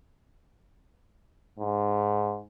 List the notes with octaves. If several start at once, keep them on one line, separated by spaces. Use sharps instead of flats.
G#2